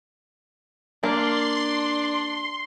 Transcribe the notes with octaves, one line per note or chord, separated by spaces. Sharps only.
A#3 D4 C6